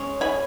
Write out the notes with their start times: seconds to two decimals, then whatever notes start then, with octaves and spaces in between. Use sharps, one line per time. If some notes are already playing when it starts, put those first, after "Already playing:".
Already playing: G#3 C#4
0.21 G#5 B5